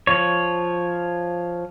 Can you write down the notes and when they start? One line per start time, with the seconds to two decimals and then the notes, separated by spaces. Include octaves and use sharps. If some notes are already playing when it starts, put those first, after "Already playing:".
0.07 F3 C#5